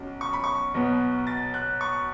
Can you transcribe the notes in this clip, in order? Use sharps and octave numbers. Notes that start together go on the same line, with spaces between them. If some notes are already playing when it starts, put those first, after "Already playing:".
Already playing: B1 C#4
C#6
B5
C#6
B1 B2 B3
A6
F#6
C#6